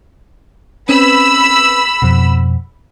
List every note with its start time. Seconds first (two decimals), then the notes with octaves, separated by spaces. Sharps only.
0.89 C4 C#4 B4 B5 E6
2.02 F2 B2